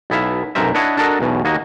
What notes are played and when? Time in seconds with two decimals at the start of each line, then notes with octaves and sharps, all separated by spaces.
0.10 B1 B3 E4 E5 F5
0.55 B1 F#2 C3 A#4 C5 E5
0.74 D4 E4 C#5 D#5 F#5
0.97 D4 F#4 A4 A#4 D#5
1.20 B1 E2 B2
1.45 D#2 A#3 F#4 D#5